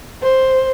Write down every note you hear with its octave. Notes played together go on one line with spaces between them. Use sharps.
C5